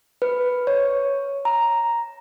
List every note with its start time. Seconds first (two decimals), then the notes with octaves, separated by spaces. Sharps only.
0.22 B4
0.67 C#5
1.45 A#5